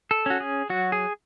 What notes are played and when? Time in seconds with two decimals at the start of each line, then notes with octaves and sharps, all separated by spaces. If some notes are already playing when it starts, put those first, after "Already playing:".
0.11 A4
0.26 C#4 F#4
0.40 G#4
0.70 F#3 F#4
0.92 G#4